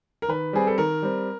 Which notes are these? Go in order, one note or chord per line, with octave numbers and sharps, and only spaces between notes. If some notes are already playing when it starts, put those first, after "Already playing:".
A#4
D#3 B4
G3 C4 G#4
A4
D#3 A#4
G3 C4